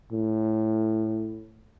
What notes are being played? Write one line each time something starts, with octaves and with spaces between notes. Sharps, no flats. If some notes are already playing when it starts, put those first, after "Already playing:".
A2